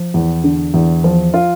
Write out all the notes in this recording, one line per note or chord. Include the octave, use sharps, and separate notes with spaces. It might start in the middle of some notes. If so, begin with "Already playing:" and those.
Already playing: F3
E2
D3
E2
F3
F4